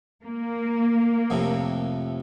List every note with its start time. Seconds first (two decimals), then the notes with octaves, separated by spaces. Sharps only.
0.22 A#3
1.30 F2 A2 C3